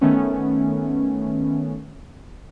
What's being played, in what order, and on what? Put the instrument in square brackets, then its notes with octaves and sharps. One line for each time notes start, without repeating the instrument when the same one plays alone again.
[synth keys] D#3 A3 B3 C#4